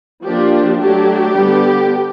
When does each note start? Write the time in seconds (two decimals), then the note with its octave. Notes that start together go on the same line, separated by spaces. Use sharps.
0.24 F3 A#3 D4 G4
0.79 F#3 A3 D4 G4
1.35 D3 G3 B3 D4